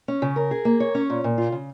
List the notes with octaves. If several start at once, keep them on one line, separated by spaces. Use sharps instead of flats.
C#4
C#3
A#4
G#4
A#3
C#5
C#4
A#2
A#2
F4
C#3